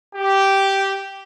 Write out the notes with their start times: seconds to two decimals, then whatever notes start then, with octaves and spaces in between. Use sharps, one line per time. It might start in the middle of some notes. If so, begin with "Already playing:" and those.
0.15 G4